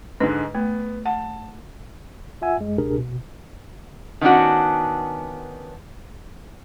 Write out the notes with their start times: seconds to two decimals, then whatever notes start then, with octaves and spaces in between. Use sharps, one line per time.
0.20 G#2 D3 G#3 B4
0.55 A3 B3
1.06 F#5 A5
2.42 F4 E5 F#5 G#5 E6
2.58 F#2 G#3
2.78 C#2 B2 D4 G4 G#4 A#4
2.98 B2
4.21 D#3 B3 C#4 D4 F#4